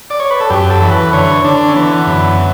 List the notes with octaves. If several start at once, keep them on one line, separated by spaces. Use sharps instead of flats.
D5
C#5
B4
A4
F#2 G4
A4
E3
B4
D3 C#5
D3 D4
C#4
E3 B3
F#2